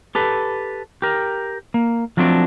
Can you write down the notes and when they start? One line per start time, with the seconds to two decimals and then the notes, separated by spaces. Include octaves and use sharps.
0.15 G4 A4 B4
1.02 G4 A#4
1.74 A#3
2.17 F3 F#3 A3 C4 D4